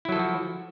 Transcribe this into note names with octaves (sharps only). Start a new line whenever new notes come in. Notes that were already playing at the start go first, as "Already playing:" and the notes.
F3 F#3 E4 F#4 A4